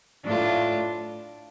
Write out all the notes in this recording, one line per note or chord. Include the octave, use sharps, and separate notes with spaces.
A2 A3 D4 F4 A4